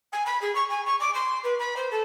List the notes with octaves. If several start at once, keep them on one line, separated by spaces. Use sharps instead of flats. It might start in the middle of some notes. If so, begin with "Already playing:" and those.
G#5
B5
G#4
C#6
G#5
C#6
D6
C6
B4
B5
C5
A4